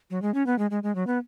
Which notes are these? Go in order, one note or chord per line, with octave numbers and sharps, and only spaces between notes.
F#3
G#3
C#4
B3
G#3
G#3
G#3
F#3
B3